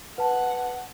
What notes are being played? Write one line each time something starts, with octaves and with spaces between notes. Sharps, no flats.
B4 F#5 A5